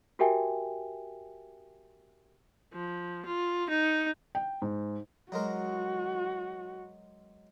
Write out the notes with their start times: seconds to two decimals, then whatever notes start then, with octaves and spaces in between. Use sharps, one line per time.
0.19 F#4 G4 A#4 E5 G5 G#5
2.74 F3
3.26 F4
3.70 D#4
4.35 G5
4.62 G#2
5.32 F#3 G#3 F#4 A#4